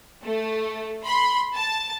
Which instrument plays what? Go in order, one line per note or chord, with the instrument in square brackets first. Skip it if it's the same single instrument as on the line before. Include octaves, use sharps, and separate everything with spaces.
[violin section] A3
B5 C6
A5